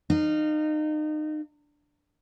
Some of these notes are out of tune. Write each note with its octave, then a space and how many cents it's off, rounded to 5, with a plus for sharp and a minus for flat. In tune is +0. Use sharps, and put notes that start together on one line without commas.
D#4 -30 F5 -5